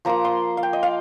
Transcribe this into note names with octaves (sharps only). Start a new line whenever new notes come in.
F3 A#3 F4 A#5
C6
F5
G5
D#5
F5